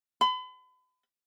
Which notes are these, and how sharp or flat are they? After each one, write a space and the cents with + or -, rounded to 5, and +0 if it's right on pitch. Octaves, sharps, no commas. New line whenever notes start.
B5 +40